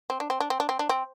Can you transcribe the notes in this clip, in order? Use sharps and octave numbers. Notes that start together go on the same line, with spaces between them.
C4
D4
C4
D4
C4
D4
C4
D4
C4